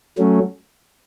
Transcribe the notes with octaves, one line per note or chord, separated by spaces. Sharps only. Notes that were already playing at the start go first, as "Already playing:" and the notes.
F#3 A3 C#4